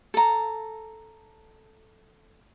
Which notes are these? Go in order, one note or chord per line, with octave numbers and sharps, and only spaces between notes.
A4 A#5